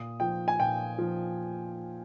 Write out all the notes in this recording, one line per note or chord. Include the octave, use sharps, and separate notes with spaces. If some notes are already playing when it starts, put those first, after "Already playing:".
Already playing: A#2 D#6
F3 G5
G#5
A#2 G5
F3